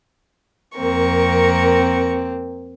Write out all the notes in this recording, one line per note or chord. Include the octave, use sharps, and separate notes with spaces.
F2 A#3 C4 A#4 C#6